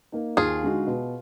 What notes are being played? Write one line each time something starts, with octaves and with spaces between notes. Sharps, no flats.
A#3 D#4
D#2 F4 G#4
D3 G#3 D#4 F#4
B2